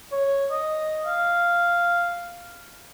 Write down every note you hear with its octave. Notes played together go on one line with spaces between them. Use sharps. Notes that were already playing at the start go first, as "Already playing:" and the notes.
C#5
D#5
F5